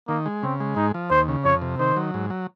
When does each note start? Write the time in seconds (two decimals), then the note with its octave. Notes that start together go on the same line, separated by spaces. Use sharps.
0.08 D#3 A#3
0.26 G#3
0.43 C#3 C4
0.60 G#3
0.76 G#2 D#4
0.94 F3
1.10 D#2 C5
1.28 C#3
1.45 F2 C#5
1.62 C3
1.79 D#3 C5
1.97 F#3
2.14 G#2
2.30 F#3